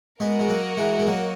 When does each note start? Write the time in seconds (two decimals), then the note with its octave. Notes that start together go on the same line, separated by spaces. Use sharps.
0.20 G#3 B3 F#4 A#4 D#5
0.39 G#3
0.49 F#3 A#3
0.77 E3 G#3
0.99 G#3
1.07 F#3 A#3